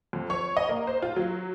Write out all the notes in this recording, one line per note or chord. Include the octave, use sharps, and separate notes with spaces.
F2
C#5
D#5
A#3
C5
F4
F#3